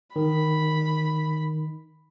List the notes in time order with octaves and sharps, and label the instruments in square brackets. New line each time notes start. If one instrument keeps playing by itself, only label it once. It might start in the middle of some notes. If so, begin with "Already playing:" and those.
[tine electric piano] D#3 [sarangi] B5